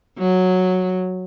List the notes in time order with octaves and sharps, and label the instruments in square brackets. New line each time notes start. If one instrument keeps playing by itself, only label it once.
[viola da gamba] F#3